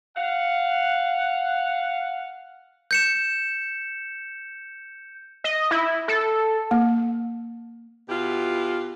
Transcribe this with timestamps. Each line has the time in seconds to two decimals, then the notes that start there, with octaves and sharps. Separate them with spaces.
0.16 F5 F#5
2.91 G6 C#7 E7
5.44 D#5
5.71 E4
6.08 A4
6.71 A#3
8.08 B2 E4 F4 G4